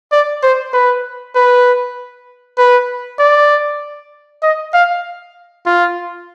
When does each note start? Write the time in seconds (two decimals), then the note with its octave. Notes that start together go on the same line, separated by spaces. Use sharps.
0.12 D5
0.43 C5
0.73 B4
1.35 B4
2.58 B4
3.19 D5
4.43 D#5
4.74 F5
5.66 F4